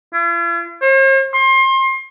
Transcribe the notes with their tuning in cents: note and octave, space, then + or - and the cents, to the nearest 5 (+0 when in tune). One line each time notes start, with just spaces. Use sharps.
F4 -45
C5 +45
C6 +30